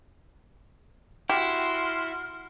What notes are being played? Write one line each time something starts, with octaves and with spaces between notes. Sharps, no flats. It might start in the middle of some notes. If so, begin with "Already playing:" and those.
E4 F#4 G4 C6 F6